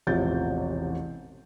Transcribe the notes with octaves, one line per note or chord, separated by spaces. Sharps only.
E1 A1 C3 F3 G6 A6